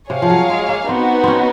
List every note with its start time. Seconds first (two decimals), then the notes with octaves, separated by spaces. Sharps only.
0.10 C3 G#4 C#5 F5
0.22 F3
0.30 F#3
0.50 G#3
0.69 A#3
0.88 B3 C4 D#4 F#4
1.24 C4 C#4